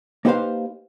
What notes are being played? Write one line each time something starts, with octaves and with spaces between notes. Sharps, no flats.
A#3 D#4 G4 B4 C5 F5